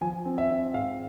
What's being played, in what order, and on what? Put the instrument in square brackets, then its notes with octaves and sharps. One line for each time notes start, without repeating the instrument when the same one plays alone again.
[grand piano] F3 G#5
C4
E5
C4
G#2 F5